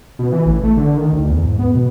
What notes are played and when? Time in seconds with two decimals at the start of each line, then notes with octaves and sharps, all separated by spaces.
0.19 B2
0.32 E3
0.46 A1
0.64 A3
0.77 D3
0.97 D#3
1.13 D2
1.30 E2
1.45 G#2
1.59 B3
1.75 B2